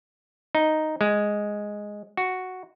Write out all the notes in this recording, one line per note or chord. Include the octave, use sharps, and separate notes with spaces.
D#4
G#3
F#4